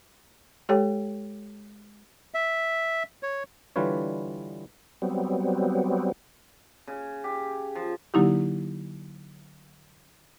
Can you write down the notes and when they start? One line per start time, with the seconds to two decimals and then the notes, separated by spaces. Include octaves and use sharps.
0.69 G#3 G4 A4 C#5 G5
2.34 E5
3.23 C#5
3.76 D3 E3 G3 F4 B4 C#5
5.02 F#3 G3 B3 C4
6.87 C#3
7.24 G4
7.75 F3
8.14 D3 F#3 A#3 D#4 E4 G4